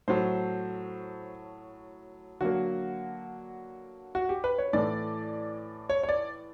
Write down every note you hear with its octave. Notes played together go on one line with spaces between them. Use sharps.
A2 F#3 A3 C5
D3 F#3 A#3 F#4
F#4
G4
B4
C#5
A2 E3 A3 D5
C#5
C#5
D5